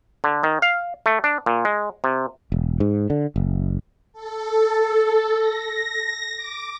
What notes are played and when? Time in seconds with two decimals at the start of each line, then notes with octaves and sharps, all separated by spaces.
0.24 D3
0.43 D#3
0.62 F5
1.06 A3
1.24 D4
1.46 A#2
1.65 G#3
2.04 C3
2.52 E1
2.80 G#2
3.10 D3
3.36 F#1
4.13 A4
5.37 A#6
6.36 D6